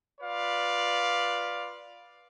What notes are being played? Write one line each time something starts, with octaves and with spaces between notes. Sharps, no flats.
F4 B4 D5 F5